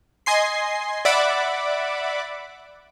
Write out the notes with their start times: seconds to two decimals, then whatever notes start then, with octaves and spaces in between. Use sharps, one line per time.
0.26 D#5 G#5 C6 C7
1.05 D5 E5 F#5 B5 D6